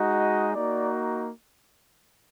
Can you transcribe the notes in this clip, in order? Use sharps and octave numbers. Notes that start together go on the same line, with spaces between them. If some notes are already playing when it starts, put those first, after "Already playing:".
Already playing: G#3 D#4 F#4
D#5
A#3 D#4 F#4 D5